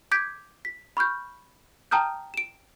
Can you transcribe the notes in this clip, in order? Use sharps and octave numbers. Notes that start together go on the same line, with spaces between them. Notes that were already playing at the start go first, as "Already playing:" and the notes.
D6 G6 G#6 B6 D7
B6
B5 C#6 F6 G6
G5 A5 A#5 D#6 F6 G6
D7 E7